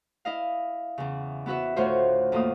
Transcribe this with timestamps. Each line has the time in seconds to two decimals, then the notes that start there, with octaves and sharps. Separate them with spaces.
0.25 E4 D#5 F5
0.98 E2 C#3
1.46 B3 E4 F#4 B4 E5
1.76 D2 A2 F4 F#4 C5 C#5
2.32 E2 A2 A3 A#3 F4 D#6